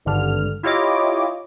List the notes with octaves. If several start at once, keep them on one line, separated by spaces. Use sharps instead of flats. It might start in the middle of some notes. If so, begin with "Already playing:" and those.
G#1 G2 D3 F6
E4 F4 G4 C#5 D#5 D6